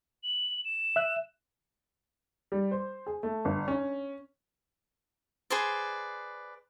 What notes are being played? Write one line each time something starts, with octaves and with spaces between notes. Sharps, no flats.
F#7
E7
E5 F#6
G3
C5
G#4
A3
G1
C#4
G#4 B4 C5 D5